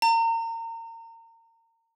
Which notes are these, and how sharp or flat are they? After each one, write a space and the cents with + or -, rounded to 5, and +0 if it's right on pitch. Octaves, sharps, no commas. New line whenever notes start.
A#5 -35